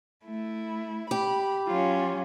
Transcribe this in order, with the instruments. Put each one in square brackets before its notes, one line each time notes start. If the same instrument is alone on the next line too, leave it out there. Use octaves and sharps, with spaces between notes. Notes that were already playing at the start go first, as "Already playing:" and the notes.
[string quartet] A3 E4
[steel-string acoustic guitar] G4 [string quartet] B5
[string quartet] F#3 C#4 [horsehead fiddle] F4